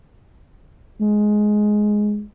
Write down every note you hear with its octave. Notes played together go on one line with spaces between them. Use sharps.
G#3